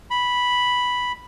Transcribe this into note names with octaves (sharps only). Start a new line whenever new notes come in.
B5